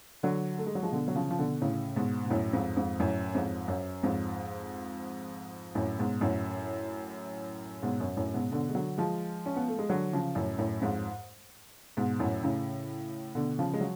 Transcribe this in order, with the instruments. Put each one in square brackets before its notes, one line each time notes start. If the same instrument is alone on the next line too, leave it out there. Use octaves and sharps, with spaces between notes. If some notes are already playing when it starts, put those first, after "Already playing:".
[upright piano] D3 F#3
A3
G#3
F#3
F3 G#3
B2 D3
F#3
C#3 F3
F3
B2 D3
A2 C#3
G#2 B2
B2
F#2 A2
F2 G#2
F2 G#2
F#2 A2
F2 G#2
F#2
F2 G#2
F#2 A2
G#2 B2
F#2 A2
G#2 B2
F#2
F#2 A2
G#2 B2
B2 D3
G#3
D3 F#3
F3 G#3
C#4
B3
A3
G#3
D3 F#3
C#3 F3
F#2 A2
F#2 A2
F2 G#2
G#2 B2
F#2 A2
A2 C#3
B2 D3
C#3 F3
G#3
F#3